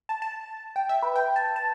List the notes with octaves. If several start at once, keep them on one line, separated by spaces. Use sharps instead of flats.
A5
A5
G5
E5
B4
G5
A5
A5